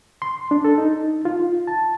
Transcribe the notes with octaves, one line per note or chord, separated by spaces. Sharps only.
C6
D4
A4
D#4
F4
A5